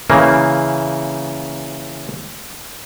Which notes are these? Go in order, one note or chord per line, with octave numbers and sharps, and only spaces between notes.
C#3 E3 A#3